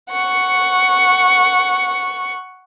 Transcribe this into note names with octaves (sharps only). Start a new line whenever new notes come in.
F#5 C#6